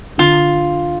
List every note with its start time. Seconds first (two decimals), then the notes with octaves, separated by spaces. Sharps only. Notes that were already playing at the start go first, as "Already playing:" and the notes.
0.18 D3 F4